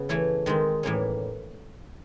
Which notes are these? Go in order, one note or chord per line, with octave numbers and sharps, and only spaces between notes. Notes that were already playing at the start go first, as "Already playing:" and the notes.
Already playing: C#3 B3
E3 A3 C#4 E4
D#3 G#3 C4
A2 E3 G3 A#3 C#4